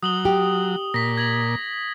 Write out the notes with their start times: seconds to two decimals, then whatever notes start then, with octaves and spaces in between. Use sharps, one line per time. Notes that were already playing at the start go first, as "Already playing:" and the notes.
0.03 F#3 D#6 F#7 G7
0.25 G4
0.94 A#2 A#6 B6
1.18 G#6 A#6 F#7